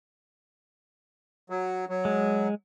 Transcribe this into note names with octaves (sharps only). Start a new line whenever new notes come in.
F#3
F#3
G#3